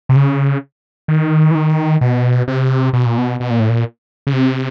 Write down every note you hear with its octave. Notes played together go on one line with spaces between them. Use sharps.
C3
C#3
D#3
E3
D#3
B2
C3
B2
A#2
B2
B2
A#2
A2
A#2
C#3
C3